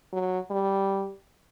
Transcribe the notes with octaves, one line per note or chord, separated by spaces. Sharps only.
F#3
G3